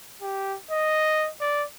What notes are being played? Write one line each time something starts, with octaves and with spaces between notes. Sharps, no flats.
G4
D#5
D5